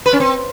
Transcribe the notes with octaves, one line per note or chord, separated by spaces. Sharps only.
B4
C#4
C4